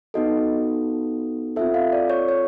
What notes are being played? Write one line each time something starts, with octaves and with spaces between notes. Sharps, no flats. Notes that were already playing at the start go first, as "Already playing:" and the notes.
B3 D#4 F#4 A4 D#5
C4 F4 A4 E5
F5
D5
C#5
C#5